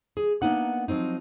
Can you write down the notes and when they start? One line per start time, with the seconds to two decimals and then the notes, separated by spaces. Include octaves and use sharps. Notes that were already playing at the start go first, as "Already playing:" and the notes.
0.17 G#4
0.42 A#3 B3 D4 D#4 F#5
0.88 F3 F#3 C4 D#4